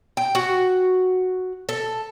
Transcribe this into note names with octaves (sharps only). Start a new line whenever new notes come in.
G5
F#4
A4